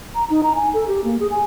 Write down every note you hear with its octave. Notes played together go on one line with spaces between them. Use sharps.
A#5
D#4
A#5
G#5
A4
G4
A#3
G#4
G#5